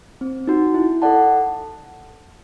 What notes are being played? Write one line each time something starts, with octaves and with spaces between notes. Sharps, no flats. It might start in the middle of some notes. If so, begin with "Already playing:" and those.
C4
D#4 F#4
E4
A4 D5 F#5 A5